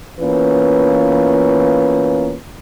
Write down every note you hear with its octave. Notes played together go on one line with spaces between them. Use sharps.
E3 A#3 B3 C#4 F4 B4